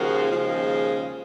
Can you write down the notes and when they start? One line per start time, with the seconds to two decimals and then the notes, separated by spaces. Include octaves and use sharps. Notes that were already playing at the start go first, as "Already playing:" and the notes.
Already playing: D#2 C#3 F3 G#3 F#4 A#4
0.30 D#2 C#3 F3 G#3